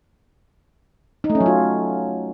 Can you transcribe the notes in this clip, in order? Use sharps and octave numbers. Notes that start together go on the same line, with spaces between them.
D#4
A3
C#4
F#3
F4